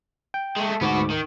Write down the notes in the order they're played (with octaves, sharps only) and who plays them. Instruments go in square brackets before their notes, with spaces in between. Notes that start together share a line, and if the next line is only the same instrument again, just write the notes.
[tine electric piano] G5
[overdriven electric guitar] G#3 A3
[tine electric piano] D2 G#2 D6 [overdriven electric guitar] B3 F#4
[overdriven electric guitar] D#3